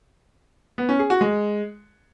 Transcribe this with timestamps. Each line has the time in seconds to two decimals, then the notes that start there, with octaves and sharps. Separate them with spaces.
0.78 B3
0.89 C#4
0.99 G#4
1.10 F#4
1.21 G#3